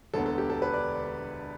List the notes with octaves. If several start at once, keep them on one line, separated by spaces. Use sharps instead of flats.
E1 D2 D3 B3 A4
A4
G4
A4
B4
D5